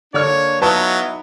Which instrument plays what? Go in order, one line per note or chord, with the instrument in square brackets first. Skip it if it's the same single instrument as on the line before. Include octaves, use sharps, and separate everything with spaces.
[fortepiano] D3 D5 F6 [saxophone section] A#3 D4 [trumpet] C#5
[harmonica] F#3 [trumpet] B3 [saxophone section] D#4 E4 F5 [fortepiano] B4 A5 C#6